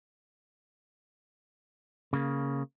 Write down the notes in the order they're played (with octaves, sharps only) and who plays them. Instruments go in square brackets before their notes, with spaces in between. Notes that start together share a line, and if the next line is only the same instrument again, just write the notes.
[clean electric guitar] C#3 A#3